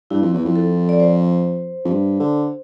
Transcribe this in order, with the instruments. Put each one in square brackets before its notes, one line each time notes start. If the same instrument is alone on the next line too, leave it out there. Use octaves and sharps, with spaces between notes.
[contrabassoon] G2 [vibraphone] E4
[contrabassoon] F2
E2
F2
[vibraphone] A4
D5
C5
[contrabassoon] F2
G2
D3